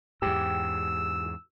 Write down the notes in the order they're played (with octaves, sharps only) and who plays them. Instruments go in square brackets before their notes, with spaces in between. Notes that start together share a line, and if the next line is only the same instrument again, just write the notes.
[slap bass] E2 G#2 [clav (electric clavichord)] G4 [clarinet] E6